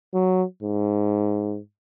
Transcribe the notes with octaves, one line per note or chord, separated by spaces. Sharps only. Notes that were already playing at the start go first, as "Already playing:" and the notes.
F#3
G#2